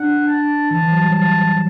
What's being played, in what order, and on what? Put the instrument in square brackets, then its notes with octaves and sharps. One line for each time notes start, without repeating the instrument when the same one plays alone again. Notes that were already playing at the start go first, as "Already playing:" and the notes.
Already playing: [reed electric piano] D4 [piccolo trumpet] F#5
[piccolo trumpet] A5
[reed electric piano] E3 [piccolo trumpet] A5
[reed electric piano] E3
F#3
G3
[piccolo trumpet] A5